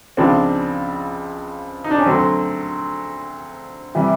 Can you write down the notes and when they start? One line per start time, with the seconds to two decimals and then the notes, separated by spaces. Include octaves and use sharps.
0.17 C#2 C#3 F3 C4 D4
1.84 D#4
1.91 D4
1.99 C#4
2.06 D2 D3 F#3 C4
3.95 C3 E3 G3